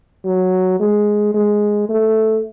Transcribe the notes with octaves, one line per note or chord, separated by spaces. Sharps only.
F#3
G#3
G#3
A3